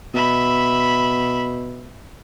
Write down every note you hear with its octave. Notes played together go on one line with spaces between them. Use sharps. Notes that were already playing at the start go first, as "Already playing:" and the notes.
B2 E5 B5